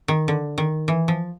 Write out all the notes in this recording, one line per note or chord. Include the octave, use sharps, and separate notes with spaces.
D#3
D3
D#3
E3
F3